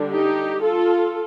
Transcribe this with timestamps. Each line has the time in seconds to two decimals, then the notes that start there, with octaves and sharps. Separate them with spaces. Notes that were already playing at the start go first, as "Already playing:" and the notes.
Already playing: D3 G3 D4
0.10 D#4 G4
0.62 F4 A4